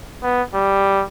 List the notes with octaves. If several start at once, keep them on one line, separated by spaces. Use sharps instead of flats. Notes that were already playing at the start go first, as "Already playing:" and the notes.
B3
G3